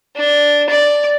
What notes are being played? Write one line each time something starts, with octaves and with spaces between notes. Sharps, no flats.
D4
D5